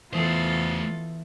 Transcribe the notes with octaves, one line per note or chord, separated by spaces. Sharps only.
E3 A3 B3 F4 A4 C5 D#6 E7